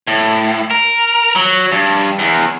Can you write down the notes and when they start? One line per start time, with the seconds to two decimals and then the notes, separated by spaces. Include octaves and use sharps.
0.07 A2
0.71 A#4
1.36 F#3
1.72 G2
2.19 E2